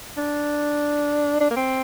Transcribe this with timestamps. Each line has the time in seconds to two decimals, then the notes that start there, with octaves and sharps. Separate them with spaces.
0.18 D4
1.41 D4
1.51 A#3
1.56 C4